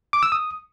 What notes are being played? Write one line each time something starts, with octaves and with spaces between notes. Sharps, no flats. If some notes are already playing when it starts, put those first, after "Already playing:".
D6
E6
D#6